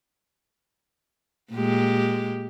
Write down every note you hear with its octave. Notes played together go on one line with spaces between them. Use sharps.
A#2 G#3 G4